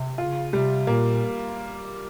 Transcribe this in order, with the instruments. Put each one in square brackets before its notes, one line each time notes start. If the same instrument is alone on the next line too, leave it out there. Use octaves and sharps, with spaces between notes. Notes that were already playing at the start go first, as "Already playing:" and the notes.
Already playing: [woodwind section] C3
[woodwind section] C#3 [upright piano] F4
[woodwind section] C3 [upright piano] G3
[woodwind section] A#2 [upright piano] A#3